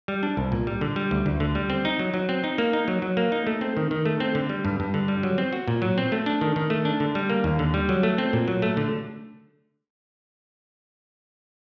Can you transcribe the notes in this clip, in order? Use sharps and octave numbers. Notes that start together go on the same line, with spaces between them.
G3
D4
C2
A#2
G3
D3
G3
D2
D2
D3
G3
C4
D#4
F#3
F#3
C4
D#4
A#3
D#4
F#3
F#3
A#3
D#4
A3
C4
D#3
D#3
A3
C4
D3
G3
G2
G2
D3
G3
F#3
C4
F#4
A#2
F#3
C4
A3
D4
D#3
D#3
A3
D4
D3
G3
A#3
D#2
D3
G3
F#3
A3
C4
A#2
F#3
A3
D3